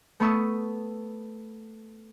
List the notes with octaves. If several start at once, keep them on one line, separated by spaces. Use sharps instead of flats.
A3 B3 B5 C#6 D#6 E6